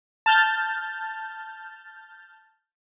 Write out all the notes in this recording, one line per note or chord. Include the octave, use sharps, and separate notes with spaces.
A5 F6 G6 A6